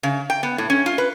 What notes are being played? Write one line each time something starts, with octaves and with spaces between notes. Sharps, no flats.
C#3
G5
B3
A2
C#4
F4
B4